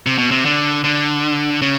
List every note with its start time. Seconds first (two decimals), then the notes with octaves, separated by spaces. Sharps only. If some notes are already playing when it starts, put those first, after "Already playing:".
0.06 C3
0.18 B2
0.31 C3
0.45 D3
0.84 D3
1.62 C#3